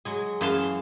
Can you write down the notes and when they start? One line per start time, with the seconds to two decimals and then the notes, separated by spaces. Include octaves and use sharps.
0.05 F#3 G#3 G#4
0.41 F#2 E3 G#4 F5 A5 C6